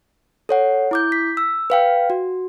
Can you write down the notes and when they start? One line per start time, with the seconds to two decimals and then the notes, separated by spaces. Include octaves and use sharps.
0.49 A4 C#5 F#5
0.91 E4 D6 G6
1.12 B6
1.37 E6
1.70 B4 F5 G5
2.10 F#4